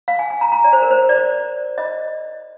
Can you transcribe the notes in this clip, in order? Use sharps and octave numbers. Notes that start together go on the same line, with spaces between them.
F5
G#5
G#5
A#5
A#5
D5
C5
A#4
C5
D5
D#5